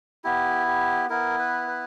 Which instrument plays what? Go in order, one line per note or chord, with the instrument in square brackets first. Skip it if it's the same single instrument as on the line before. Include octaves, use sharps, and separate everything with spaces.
[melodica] B3 E4 G4
G4
B3 E4 A#4
B4
B4